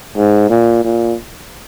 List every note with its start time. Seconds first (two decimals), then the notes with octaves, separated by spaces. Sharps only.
0.17 G#2
0.50 A#2
0.84 A#2